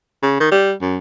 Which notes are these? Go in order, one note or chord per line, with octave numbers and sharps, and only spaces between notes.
C#3
D#3
G3
F#2